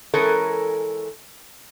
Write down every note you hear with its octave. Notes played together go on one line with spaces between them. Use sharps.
E3 G#3 C#4 A4 A#4